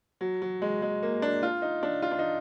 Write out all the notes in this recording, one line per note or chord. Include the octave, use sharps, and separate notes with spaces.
F#3
F#3
G#3
G#3
A#3
D4
F4
D#4
D4
F4
D4
D#4